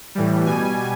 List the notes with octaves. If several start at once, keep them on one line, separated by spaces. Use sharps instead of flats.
A2 E3 G3
B2 G3 G#5